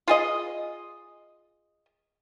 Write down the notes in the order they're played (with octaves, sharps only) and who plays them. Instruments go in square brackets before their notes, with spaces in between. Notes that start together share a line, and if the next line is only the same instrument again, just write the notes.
[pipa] F4 G#4 D#5